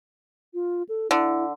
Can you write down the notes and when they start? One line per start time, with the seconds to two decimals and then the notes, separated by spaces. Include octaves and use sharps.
0.54 F4
0.89 A4
1.11 D3 E4